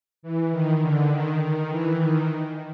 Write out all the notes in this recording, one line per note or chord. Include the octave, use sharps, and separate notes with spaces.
E3
D#3
D3
D#3
D#3
E3
D#3